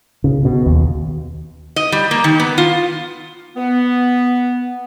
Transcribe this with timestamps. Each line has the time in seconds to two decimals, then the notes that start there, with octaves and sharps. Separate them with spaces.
0.24 C#3
0.45 B2
0.66 D#2
1.76 D#5
1.92 G3
2.11 A#3
2.24 D#3
2.40 B3
2.58 F4
3.56 B3